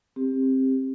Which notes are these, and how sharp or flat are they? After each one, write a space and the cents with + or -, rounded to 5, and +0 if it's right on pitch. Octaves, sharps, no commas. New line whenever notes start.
C4 +15 G4 +25